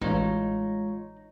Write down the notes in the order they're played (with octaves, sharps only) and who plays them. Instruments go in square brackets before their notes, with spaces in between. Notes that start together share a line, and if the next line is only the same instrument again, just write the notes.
[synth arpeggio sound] A1 [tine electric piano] G#3 F4 C#5 [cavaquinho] D#4